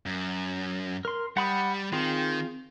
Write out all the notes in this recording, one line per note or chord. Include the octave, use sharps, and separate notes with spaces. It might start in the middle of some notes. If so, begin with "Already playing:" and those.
F#2
A#4 C6
G3 F#5 B5 D#6
D#3 C4 F4 G#4